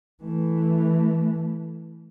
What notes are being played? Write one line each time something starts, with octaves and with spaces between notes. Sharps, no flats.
E3 A3